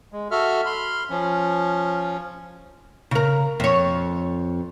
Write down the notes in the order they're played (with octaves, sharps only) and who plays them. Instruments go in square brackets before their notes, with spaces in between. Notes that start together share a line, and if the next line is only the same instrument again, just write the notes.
[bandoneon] G#3
F#4 A4 E5 F6
B5 C6 F6
F3 C#4
[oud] C#3 A#4
F2 C#5